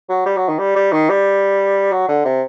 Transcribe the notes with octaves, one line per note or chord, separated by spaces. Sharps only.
F#3
G3
F#3
D#3
G3
G3
D#3
G3
F#3
D3
C3